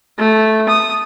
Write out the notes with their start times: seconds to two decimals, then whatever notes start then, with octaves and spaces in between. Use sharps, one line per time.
0.18 A3
0.69 D#6